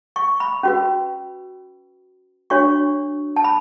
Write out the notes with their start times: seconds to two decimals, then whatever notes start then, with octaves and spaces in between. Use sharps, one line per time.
0.16 C#6
0.40 B5
0.63 C#4 F#4 B4
2.50 D4 F#4 C#5 C#6
3.36 A5
3.44 B5